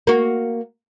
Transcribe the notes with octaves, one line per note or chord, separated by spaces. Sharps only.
A#3 F#4